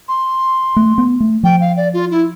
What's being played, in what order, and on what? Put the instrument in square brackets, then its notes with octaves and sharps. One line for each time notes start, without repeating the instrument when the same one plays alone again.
[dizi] C6
[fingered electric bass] A3
B3
A3
[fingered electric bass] F3 [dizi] G5
[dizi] F5
D5
F4
E4